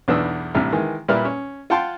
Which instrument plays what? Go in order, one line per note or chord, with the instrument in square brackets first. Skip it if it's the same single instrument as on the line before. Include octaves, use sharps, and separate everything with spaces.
[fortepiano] B1 E2 B3 D4 D#6 E6
A1 C3 G3 D4 E5 F6
D#3 E3 G#3
A#2 G3 E4 B4 F6
C#4
F4 F#5 G5 A5 C6